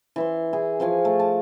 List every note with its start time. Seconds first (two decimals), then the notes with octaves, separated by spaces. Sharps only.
0.16 E3 E5 C6
0.53 E4 G#4
0.80 F3 F5 G#5 C#6
1.05 A3
1.20 A5